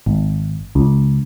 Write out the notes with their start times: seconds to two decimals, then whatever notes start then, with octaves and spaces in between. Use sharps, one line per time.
0.06 G#1
0.75 C#2